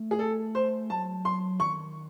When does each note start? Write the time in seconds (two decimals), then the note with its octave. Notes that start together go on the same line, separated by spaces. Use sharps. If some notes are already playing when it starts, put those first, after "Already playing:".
Already playing: A3
0.11 G#4
0.19 A4
0.55 C5
0.90 F#3 A5
1.25 C6
1.60 D#3 C#6